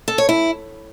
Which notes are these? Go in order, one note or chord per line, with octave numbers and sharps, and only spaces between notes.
A4
C#5
E4